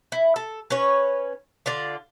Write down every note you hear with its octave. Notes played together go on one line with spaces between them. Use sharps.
E4
A4
C#4 B4 C#5
D3 F4 D5